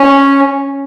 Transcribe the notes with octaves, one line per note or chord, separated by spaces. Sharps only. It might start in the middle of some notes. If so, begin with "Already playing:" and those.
Already playing: C#4